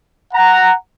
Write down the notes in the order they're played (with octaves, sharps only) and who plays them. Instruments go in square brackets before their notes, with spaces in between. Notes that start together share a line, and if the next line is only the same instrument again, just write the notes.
[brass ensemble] F#5 A#5